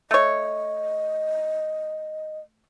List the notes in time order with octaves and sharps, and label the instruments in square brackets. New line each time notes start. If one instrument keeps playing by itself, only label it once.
[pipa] A3 C#5 [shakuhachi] D#5